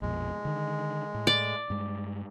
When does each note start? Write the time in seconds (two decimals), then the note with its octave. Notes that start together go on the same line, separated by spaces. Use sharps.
0.02 A#1 F2 B2 G#3
0.45 D3 D#3
1.14 A2
1.27 D5
1.70 G2 G#3